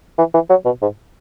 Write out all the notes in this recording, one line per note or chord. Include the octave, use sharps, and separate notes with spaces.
E3
E3
F#3
B2
G#2